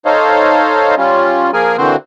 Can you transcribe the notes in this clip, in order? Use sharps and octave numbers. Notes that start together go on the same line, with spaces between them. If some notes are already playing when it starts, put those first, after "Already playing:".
D#4 A4 C5 C#5 D#5 F5
G3 C#4 F4
F3 A#3 G#4 A#4 G#5
D3 E3 A#3 C4 F#4 C5